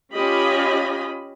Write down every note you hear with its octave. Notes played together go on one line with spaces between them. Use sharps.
C#4 F4 G4 D#5 B5